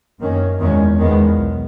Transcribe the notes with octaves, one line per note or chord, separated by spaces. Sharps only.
F#2 D#3 A#3 C#4
E2 D#3 G#3 C#4
E2 D#3 G#3 B3
B1